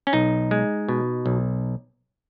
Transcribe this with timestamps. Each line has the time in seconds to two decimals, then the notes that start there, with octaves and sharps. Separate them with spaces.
0.07 C#4
0.13 B1 D#4
0.51 G#3
0.89 B2
1.26 B1